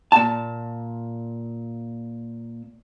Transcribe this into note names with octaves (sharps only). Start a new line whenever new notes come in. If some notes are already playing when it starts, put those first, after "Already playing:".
A#2 A5